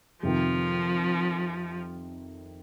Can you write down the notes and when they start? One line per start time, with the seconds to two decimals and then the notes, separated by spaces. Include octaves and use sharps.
0.23 F2 C3 D#3 F3